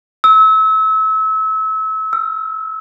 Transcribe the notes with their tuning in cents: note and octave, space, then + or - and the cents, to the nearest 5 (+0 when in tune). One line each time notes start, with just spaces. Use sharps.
E6 -30
E6 +30